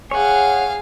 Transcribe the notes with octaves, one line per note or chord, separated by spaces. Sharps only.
G#4 C#5 F5 F#5